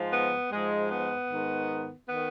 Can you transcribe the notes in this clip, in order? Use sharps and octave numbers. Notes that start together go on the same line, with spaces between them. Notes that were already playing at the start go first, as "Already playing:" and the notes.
Already playing: G#2 F3
B3
G#2 F3 G#3
B3
G#2 D#3
D#3 B3